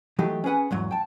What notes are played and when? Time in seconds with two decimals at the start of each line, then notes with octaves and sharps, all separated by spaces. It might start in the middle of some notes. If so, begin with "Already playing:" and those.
0.19 E3 F#3 A3 D#4 G4
0.44 C#4 G#4 B4 F#5 G#5
0.71 E2 G#2 F#3
0.91 G5 A5